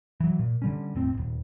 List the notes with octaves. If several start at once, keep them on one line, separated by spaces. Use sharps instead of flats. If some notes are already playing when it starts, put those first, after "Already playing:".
E3 F#3
A#2
D3 G3 C#4
E1 A2 C4
D#1 A#1